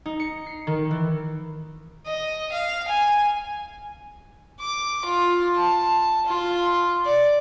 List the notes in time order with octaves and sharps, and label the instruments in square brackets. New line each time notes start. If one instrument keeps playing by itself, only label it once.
[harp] D#4
C#7
C7
D#3
E3
[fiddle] D#5
F5
G#5
D6
F4
A5
F4
D5